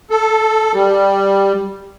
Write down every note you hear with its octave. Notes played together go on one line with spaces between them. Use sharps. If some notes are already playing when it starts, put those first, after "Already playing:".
A4
G3